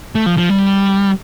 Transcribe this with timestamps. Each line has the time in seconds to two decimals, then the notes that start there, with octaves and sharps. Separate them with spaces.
0.15 A3
0.26 F3
0.37 F3
0.50 G3